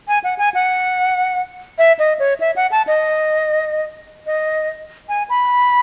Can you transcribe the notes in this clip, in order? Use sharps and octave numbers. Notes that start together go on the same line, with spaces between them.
G#5
F#5
G#5
F#5
E5
D#5
C#5
E5
F#5
A5
D#5
D#5
G#5
B5